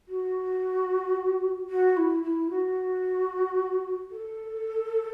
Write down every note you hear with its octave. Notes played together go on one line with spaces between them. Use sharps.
F#4
F#4
E4
E4
F#4
A4